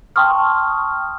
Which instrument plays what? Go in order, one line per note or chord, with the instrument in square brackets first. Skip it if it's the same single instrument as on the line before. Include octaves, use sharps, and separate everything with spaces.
[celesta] G5 A5 C6 C#6 D#6 F6